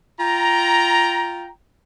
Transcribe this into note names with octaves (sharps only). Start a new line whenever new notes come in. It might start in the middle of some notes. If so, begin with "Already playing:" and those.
F4 G5 A#5